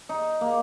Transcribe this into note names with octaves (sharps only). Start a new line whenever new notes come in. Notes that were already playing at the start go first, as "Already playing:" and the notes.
D#4
A#3